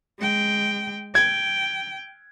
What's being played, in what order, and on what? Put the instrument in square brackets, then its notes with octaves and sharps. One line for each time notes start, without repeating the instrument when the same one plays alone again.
[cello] G#3 G5
[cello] G5 [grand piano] G#6